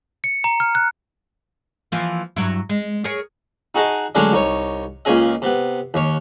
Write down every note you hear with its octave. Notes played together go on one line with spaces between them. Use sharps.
C#7
A#5
F6
F#6
E3 F3 A#3
G2 F#3 E4
G#3
G#4 A#4 C#5
D#4 F#4 G#4 D#5 A5
A2 D3 F#3 G#3 C#4 D4
C2 D#4 C#5
C#2 A#2 C#4 G#4 D#5
C3 B3
D#2 C#5